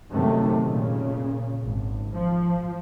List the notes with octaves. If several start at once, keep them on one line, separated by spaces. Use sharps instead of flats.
F#2 C3 D#3 A3
A#2 C#3
G#1
F3